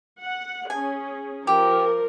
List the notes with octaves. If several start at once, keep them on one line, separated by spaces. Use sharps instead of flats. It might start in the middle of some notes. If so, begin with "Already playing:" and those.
F#5
C#4 G#4 G#5
F3 G4 A#4